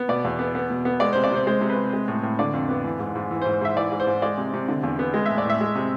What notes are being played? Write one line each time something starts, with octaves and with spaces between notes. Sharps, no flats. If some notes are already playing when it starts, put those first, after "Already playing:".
Already playing: B3
B2 D5
E2
B3
B3
B2
B3
G#3 D5
C3 C5
D5
C3 C5
G#3 C5
C3
B4
C3
G#3
A2
A2
D3 D5
F2
B3
E3
G#2
G#2
E3
C5
G#2
C5
G#2 E5
E3 D5
G#2
C5
G#2
G#3 D5
C3
C3
D3
E2
B3
G#3
A2 E5
D5
A2 E5
G#3
C3